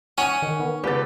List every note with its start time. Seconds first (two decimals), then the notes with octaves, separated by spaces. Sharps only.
0.18 C#4 F#5 G#5 C#6 D#6 F#6
0.42 D#3
0.59 D#3 B3
0.84 C#2 B3 G4 A4 B4 A6